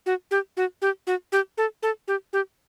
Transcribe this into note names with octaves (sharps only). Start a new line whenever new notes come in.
F#4
G4
F#4
G4
F#4
G4
A4
A4
G4
G4